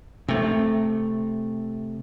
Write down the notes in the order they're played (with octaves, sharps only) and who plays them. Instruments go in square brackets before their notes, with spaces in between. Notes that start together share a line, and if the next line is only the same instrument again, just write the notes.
[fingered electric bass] C3 A3